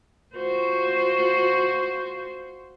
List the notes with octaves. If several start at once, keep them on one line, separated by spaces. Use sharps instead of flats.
F4 F#4 C5